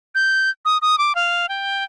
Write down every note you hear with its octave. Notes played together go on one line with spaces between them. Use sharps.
G6
D#6
D#6
D6
F5
G5